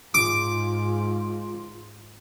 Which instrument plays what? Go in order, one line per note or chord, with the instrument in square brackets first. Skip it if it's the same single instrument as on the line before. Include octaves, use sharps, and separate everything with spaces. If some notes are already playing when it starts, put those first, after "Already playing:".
[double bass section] G#2 [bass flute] F4 [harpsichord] D6